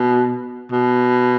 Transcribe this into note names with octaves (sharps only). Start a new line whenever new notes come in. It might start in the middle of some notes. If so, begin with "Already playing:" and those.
Already playing: B2
B2